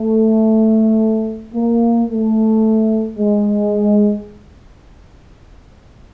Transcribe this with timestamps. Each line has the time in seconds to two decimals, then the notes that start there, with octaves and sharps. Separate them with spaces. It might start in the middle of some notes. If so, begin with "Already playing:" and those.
Already playing: A3
1.54 A#3
2.09 A3
3.18 G#3